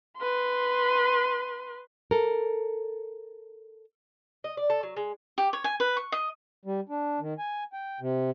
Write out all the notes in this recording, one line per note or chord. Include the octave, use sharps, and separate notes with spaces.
B4 C6
A4 A#4
D#5
D5
A4
F#3
G#3
G4
C#5
G#5
B4
C#6
D#5
G3
D4
D#3
G#5
G5
C3